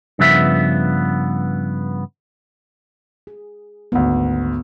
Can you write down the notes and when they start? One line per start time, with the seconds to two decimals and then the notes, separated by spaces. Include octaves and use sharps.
0.19 G2 C#3 F3 B3 E5
3.27 G#4
3.92 G#1 D2 B3